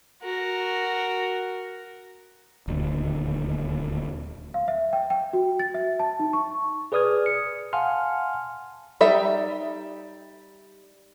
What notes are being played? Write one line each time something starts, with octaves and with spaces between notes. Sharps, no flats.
F#4 A#4
D#1 D2
F5
E5
G5
G5
F#4
A6
E5
A5
D#4
C#6
G#4 B4 D5 D#6 F6 G#6
C#7
F5 F#5 G#5 A5 C6 F6
G3 D#4 E5